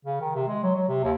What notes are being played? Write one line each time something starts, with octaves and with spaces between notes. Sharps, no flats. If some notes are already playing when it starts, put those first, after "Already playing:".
C#3
D#3
C3
G#3
F#3
F#3
C3
D#2